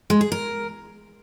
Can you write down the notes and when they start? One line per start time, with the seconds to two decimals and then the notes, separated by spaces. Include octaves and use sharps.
0.10 G#3
0.21 G#4
0.32 A#4